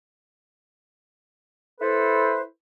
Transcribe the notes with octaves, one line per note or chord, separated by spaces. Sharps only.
E4 A4 B4 C5